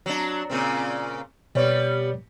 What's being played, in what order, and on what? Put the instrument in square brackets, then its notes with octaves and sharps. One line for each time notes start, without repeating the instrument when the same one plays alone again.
[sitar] F#3 D4
A#2 C#3 C4
[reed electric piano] B2 C#5 D5 [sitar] G3 B3